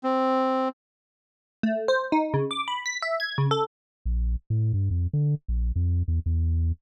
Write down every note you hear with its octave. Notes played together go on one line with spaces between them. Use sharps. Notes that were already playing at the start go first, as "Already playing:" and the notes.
C4
A3
C5
D#4
C#3
D6
B5
B6
E5
G#6
C#3
A4
A#1
A2
G2
F2
D3
A#1
F2
E2
E2